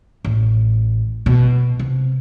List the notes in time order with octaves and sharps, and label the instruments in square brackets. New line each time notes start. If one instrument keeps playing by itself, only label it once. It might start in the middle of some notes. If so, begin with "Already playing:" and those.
[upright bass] A1
B2
C3